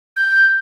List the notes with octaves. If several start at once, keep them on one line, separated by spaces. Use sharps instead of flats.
G6